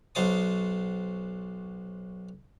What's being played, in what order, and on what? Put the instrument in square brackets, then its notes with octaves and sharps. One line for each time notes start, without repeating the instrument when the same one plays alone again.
[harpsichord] B1 F#3 C5 A5 D#6